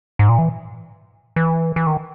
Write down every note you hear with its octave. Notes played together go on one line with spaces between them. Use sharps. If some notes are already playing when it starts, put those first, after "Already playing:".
G#2
A#2
E3
E3
E3
D#3